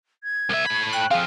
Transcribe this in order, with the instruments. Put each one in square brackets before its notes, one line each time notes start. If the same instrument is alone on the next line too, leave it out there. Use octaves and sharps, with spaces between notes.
[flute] G#6
[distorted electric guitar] C2 E5
A2 B5
[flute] G5 [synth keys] F#6
[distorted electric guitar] F3 C4 [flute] G#4 [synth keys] F5